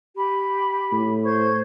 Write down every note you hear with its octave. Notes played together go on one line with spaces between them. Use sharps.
G4 B5
A2
C5 C#6 G#6